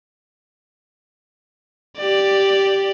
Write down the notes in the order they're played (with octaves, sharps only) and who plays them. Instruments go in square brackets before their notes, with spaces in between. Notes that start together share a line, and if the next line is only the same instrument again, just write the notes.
[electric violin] G4 D5